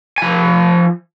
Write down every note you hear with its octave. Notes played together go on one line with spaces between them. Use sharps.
F3 G#5